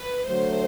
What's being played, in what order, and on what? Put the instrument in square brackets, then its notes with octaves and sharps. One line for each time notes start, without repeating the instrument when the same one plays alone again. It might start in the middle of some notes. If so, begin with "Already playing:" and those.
Already playing: [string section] B4
[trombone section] D3 F#3 A3 [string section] C5